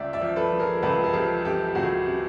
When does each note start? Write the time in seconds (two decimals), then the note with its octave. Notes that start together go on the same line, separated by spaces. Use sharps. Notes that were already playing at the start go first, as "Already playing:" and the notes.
Already playing: C#2 D5 E5
0.13 D5 E5
0.21 F3
0.36 A4 B4
0.52 F3
0.59 G#4 A#4
0.82 C#2 A4 B4
1.04 G#4
1.13 F3 G4 A4
1.45 C3 G4 A4
1.68 G4
1.75 C#2 F#4 G#4
2.06 C3